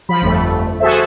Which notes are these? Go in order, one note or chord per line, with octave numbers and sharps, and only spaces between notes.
F3 B5
G1 F2 A3
F#4 G#4 A4 C5 E5